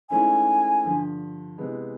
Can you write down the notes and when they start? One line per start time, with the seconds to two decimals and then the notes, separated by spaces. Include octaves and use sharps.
0.10 G#2 E3 A3 C#4 E4 G#5
0.84 G2 D3 F3
1.58 C3 E3 G#3 B3